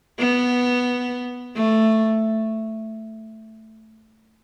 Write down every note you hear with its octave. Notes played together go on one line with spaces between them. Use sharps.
B3
A3